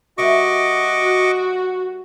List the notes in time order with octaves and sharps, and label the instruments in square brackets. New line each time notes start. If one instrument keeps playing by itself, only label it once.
[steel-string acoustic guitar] G3 A#4 E5 [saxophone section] F#4 [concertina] D#5 C#6 D6